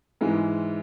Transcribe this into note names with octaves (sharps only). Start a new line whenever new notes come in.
G#2 E3 G#3